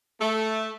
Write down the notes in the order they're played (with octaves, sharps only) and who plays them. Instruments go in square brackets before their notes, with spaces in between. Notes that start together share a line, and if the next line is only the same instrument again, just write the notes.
[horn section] A3